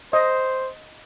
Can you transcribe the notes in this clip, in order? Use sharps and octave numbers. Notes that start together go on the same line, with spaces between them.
C5 D#5